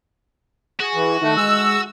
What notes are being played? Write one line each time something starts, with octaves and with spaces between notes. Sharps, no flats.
F#4 G#4
E3
D#3 A3
G#3 E6